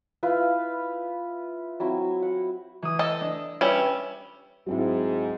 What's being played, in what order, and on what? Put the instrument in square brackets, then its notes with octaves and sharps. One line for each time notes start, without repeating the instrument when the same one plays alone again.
[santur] E4 F4 B4 F5
F#3 C4 E4
F#5
[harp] E3 D#6
[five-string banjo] A4 D#5
[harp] D4
[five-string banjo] G3 C#4 [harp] B4 E5
[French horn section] G#2 [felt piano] F#3 C4 E4